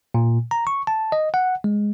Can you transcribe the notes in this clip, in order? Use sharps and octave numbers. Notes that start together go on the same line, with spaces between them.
A#2
A#5
C#6
A5
D#5
F#5
G#3